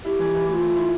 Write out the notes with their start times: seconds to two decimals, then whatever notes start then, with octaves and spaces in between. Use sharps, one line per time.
0.05 E4 G4
0.19 E3
0.34 E3
0.48 A3 G4
0.53 F4
0.62 A3
0.76 E4